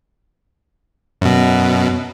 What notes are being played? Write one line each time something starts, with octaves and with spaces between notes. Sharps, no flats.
F#2 B2